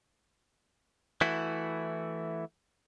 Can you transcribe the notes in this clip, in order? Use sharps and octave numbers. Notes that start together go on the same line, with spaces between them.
E3 A3 E4 F#4